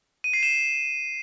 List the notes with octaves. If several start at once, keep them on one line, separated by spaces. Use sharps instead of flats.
D#7
C7
E7